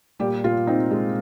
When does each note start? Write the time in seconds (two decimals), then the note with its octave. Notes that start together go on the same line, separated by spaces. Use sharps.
0.19 A#2 G3 G4
0.44 A#2 F4
0.67 C4 D#4
0.91 G#3